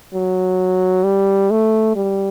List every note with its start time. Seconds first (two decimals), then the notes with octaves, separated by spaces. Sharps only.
0.14 F#3
1.04 G3
1.51 A3
1.96 G3